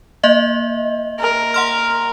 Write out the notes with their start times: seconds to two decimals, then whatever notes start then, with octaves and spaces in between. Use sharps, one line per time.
0.23 A#3 D#5 E5
1.19 A#4
1.54 F#5 C6 F6